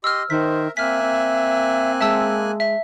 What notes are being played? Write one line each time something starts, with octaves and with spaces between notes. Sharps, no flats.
G4 D#5 C6 E6 F6
D#3 A#4 C5 E5 B6
A#3 C4 E5 G#5 F6 F#6 B6
C4
G#3 E5 A5 E6
E5